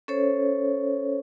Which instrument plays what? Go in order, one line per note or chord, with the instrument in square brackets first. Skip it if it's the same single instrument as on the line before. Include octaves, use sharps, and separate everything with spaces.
[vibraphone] C#4 A4 C5 C#5